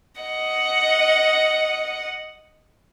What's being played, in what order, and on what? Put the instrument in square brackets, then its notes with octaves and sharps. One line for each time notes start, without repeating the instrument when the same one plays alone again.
[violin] D#5 F#5